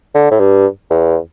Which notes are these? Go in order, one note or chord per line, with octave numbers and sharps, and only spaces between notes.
D3
A2
G2
E2